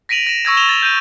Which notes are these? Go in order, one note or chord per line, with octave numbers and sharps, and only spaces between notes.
A#6 B6 D7 D#7 F7 F#7
A#6 E7
C#6 E6 G#6 A#6
E7 F7 G7
A6 F7
G6 A6 D#7